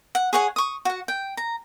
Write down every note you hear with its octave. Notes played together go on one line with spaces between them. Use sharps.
F#5
G#4 C#5 F#5 G#5
C#6 D#6
F#4 F#5
G5
A#5